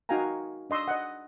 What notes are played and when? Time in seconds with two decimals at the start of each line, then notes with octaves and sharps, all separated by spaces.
0.09 D#4 F#4 F5 G5 G#5 A#5
0.70 D4 D#5 C6 C#6 E6
0.88 D#5 F#5